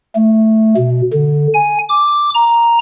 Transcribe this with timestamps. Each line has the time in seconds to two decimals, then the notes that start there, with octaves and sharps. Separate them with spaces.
0.16 A3
0.77 B2
1.13 D3
1.54 G#5
1.89 D6
2.35 A#5